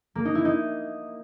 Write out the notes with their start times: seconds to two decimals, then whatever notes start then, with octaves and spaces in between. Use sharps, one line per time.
0.15 A#3
0.25 D#4
0.35 E4
0.45 D#4